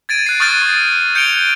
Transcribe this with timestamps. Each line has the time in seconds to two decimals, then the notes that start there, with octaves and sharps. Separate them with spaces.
0.09 G#6 A6 D7 D#7
0.26 F#6 C7
0.40 C#6 D#6 F6 G6 A6 D#7
1.15 G6 C#7 D7 F7 G7